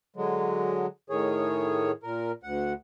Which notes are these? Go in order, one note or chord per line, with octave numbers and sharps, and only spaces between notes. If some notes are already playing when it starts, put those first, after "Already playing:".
D3 F#3 G#3
A2 D#3 G#4 C#5
A#2 A#4
D2 F#5